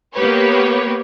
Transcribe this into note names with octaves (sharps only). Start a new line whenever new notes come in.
A#3 B3 G4 B4 C#5